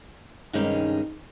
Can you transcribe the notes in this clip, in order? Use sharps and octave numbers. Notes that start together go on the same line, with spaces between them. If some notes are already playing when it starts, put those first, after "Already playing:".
G2 C3 D#3 G#3 C#4 D#4